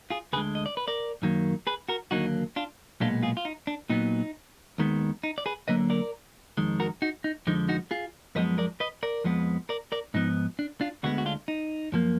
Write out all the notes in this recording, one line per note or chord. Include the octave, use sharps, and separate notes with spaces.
F4 G#4
D2 D3 G#3 G#4 B4
D#5
D5
B4
A#4 D5
F#2 D#3 F#3 A#3
G#4 B4
F#4 A#4
D#2 D3 F#3 A#3 D#4 F#4
D4 F4
B1 A#2 G#3 B3 D4 F4
F4 G#4
F4
D#4
D4
A#2 F#3 B3 D#4
D#2 D#3 G#3 B3
D#4
D5
G#4 B4
D2 D3 F#3 A#3 B4 D#5
A#4 D5
F2 D#3 G#3
F#4 A#4
D#4 F#4
D#4
F2 D3 F3 G#3 D#4
D#4 F#4
F4 G#4
F#2 F3 G#3 B3 B4 D#5
A#4 D5
B4 D#5
A#4 D5
F2 F3 G#3 B3
A#4 D5
A#4 D5
G#2 F3 B3 D#4
D4
D4 F4
D2 D3 G#3 B3 D#4 F#4
F#4
D4 F4
D#4
F#2 F3 A#3